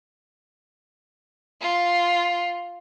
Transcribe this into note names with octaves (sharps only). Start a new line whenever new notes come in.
F4